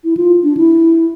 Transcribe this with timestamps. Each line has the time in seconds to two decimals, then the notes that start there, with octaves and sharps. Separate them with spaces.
0.04 E4
0.17 F4
0.43 D4
0.57 E4